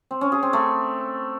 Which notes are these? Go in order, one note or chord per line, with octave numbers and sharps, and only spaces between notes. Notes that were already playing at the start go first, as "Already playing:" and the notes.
C4
C#4
G#4
C4
A3